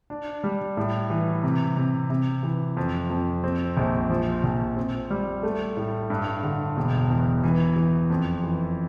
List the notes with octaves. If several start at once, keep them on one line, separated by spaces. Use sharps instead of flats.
D4
G3
A2
E3
C3
C3
C3
E3
F2
F2
C4
A#1
F3
A#1
C4
G3
A3
A2
G2
D3
E1
E2
E3
E3
F2
E3